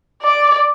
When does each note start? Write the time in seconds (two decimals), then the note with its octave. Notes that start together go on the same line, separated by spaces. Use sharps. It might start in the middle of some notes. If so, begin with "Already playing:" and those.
0.23 D5